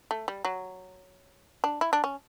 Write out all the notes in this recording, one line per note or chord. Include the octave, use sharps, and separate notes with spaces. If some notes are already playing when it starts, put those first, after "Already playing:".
A3
G3
F#3
D4
E4
D4
C#4